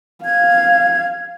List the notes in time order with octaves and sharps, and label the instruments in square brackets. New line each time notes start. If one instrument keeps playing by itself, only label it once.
[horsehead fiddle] F5 [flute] G#6